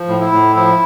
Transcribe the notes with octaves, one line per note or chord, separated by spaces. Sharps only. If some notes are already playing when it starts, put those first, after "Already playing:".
Already playing: F3
A2
E4
A2
F3 E4